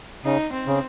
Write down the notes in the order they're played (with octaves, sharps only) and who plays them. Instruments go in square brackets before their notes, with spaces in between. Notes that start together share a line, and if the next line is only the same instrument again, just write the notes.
[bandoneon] C#3 [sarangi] D#4
[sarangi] C4
[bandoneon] C#3